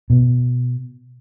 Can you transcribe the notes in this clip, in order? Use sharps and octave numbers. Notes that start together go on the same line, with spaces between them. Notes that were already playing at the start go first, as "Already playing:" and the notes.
B2